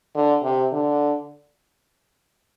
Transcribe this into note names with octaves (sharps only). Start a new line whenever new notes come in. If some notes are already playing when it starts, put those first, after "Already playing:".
D3
C3
D3